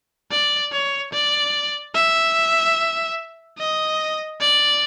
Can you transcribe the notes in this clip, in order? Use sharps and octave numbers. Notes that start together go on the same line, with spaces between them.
D5
C#5
D5
E5
D#5
D5